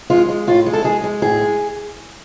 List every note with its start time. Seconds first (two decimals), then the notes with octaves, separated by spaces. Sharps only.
0.10 G#3 F4
0.29 G#3
0.47 A2 F4
0.66 G#3
0.73 A4
0.84 G#3 G#4
1.04 G#3
1.22 A2 G#4
1.41 G#3